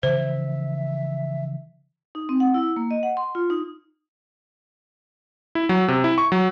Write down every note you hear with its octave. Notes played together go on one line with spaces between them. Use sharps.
C#3 E3 F3 C5 E5
D#4
C4
F#5
E4
A#3
D#5
F#5
C6
F4
D#4
E4
F#3
C3
E4
C#6
F#3